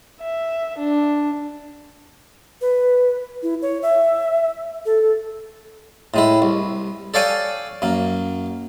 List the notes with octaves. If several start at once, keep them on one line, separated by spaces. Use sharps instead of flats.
E5
D4
B4
E4
C#5
E5
A4
A2 G#3 E4
C2
A4 C#5 D5 F5 G5 G#5
F#2 A#3